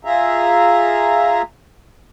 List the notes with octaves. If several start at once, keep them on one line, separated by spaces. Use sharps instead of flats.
F4 G#4 E5 A#5